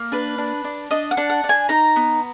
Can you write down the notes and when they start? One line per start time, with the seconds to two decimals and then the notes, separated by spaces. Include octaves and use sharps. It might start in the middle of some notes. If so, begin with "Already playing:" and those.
Already playing: A#3
0.12 D4 B4
0.38 D4
0.64 D4
0.91 D4 D#5
1.11 F#5
1.17 D4
1.30 F#5
1.44 D4
1.49 G#5
1.69 D#4 A#5
1.96 B3